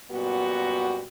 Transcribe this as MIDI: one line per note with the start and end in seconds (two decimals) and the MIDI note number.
0.11 1.04 42
0.11 1.04 46
0.11 1.04 55
0.11 1.04 59
0.11 1.04 66